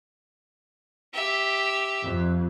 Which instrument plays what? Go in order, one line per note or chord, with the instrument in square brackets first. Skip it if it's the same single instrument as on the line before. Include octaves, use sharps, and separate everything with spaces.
[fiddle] G4 E5
[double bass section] F2